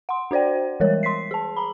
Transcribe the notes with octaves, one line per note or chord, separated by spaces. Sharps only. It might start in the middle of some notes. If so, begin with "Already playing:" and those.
F#5 C6
D4 F#4 C5 D5 G5
E3 G3 G#3 A#4 C#5
C6 B6 C7
G#4 A5
A#5 B5